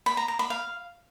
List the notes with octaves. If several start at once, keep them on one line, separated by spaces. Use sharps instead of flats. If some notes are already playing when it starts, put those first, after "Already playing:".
B5
A#5
A#5
B5
F5